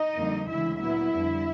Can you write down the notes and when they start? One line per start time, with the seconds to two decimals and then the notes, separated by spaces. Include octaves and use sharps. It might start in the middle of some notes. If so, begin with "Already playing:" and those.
Already playing: D#4 D#5
0.16 F2 D3 G3 A#3
0.48 D2 C#3 E3 G#3 E4 E5
0.80 A#2 F#3 B3 E4 E5
1.12 F2 D3 G3